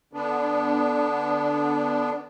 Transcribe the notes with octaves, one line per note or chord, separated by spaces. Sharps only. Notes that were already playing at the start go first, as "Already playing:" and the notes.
D3 B3 D4